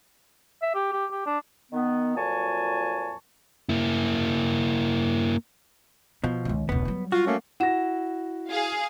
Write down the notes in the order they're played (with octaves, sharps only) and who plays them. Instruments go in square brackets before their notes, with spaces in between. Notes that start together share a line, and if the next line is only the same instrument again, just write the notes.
[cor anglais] E5
G4
G4
G4
D4
[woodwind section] D#3 B3
F2 A#2 F#3 G#5 A5 C#6
[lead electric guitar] A#3 E4
[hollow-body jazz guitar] B2 F3 [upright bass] B3
[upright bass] C#2 D#3
[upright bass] E1 C#2 [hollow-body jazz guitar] B3
[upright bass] F#3 G3
[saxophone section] F4 [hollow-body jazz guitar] F#4
[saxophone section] A3 A#3 C#4
[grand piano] E4 F#4 A#6 [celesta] F#5 E7
[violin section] G#4 F5